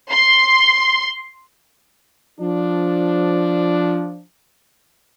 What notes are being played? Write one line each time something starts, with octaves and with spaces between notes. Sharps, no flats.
C6
F3 D4